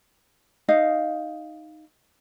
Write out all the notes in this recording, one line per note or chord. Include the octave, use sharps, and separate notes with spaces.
D#4 D#5 F5